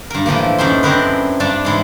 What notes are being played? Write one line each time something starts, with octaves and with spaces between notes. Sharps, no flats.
G2 A#4
A2 E3 F3 A#3
F#2 C#4 D#4 E5 C6
C4 D4 E4 G#4 A#4 B4
G2 D4 D5 A5
G#2 E3 E4